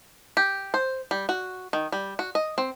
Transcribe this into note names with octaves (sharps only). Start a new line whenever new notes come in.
G4
C5
G3
F#4
D#3
G3
F#4
D#5
C4